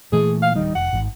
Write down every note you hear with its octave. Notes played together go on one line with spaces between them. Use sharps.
A#2 E3 A3 G#4
F5
D1 D#3 G3 D#4
F1 F#5
G#1